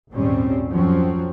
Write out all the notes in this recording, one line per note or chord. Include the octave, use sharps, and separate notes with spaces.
G#1 D#2 A#2 G3 C4 C#4
F2 F3 F#3 C4 C#4